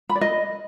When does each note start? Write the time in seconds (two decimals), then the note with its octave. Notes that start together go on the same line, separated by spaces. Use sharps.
0.09 B5
0.15 D5
0.21 D#5